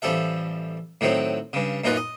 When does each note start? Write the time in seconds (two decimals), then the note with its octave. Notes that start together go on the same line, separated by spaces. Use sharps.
0.02 A1 F3 G3 A4 E5
1.01 A2 D#3 F#3 C4
1.53 G2 C#3
1.84 F#2 A#2 D#4 F4 B4
1.96 D#5